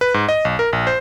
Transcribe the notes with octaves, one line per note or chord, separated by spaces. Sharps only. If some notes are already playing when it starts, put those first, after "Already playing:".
B4
G#2
D#5
B1
A#4
A#1
C5